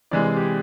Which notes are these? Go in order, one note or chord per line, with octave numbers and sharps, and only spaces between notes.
C3 E3 G#3 D5
G#4
G4